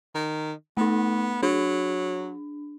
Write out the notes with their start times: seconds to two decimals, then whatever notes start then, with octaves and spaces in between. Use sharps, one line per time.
0.15 D#3
0.77 A3 B3 D#4
1.43 F#3 D4